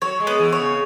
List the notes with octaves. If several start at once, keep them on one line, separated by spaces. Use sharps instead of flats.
F#3 C#5
G#3
B3
E3
C#5
C#3